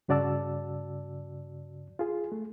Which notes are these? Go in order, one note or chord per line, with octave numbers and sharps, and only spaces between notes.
G2 C#3 F#4 D5 A5 E6
F4 G#4
A3